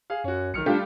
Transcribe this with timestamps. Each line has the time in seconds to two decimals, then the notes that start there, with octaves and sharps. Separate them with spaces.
0.10 G#4 F5
0.24 F#2 C#4 F#4
0.54 B1 D#3 F6 C#7
0.66 G3 A3 D4 F4 G4